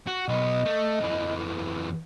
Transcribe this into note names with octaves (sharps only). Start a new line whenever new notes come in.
F#4
B1 B3 D#5
A3
F2 E3